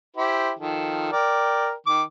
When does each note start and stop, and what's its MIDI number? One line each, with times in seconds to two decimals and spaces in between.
0.17 0.51 64
0.17 0.51 67
0.17 0.51 72
0.59 1.08 51
0.59 1.08 53
0.59 1.08 69
1.12 1.72 70
1.12 1.72 74
1.12 1.72 79
1.86 2.03 51
1.86 2.03 86